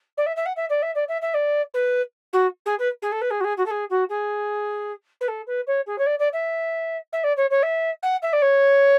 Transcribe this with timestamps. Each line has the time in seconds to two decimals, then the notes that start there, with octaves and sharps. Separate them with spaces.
0.17 D5
0.26 E5
0.36 E5
0.46 F#5
0.56 E5
0.70 D5
0.82 E5
0.95 D5
1.08 E5
1.22 E5
1.34 D5
1.74 B4
2.33 F#4
2.66 G#4
2.79 B4
3.02 G#4
3.12 A4
3.21 B4
3.30 G#4
3.40 F#4
3.44 G#4
3.57 F#4
3.66 A4
3.71 G#4
3.90 F#4
4.09 G#4
5.21 B4
5.28 A4
5.47 B4
5.67 C#5
5.86 G#4
5.98 C#5
6.06 D5
6.19 D5
6.33 E5
7.12 E5
7.24 D5
7.37 C#5
7.50 C#5
7.63 E5
8.02 F#5
8.22 E5
8.33 D5
8.42 C#5